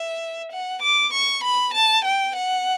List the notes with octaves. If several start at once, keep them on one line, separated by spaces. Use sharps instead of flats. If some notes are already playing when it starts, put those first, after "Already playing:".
Already playing: E5
F#5
D6
C#6
B5
A5
G5
F#5